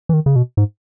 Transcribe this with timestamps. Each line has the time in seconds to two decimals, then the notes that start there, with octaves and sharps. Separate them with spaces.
0.09 E3
0.13 D#3
0.26 C#3
0.36 B2
0.57 G#2